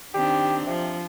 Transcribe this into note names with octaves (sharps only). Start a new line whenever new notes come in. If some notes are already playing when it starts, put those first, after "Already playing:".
D#3 C4 D4 G4
C3 F3